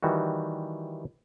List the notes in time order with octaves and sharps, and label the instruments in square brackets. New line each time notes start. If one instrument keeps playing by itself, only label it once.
[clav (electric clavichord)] D#3 E3 G3 F#4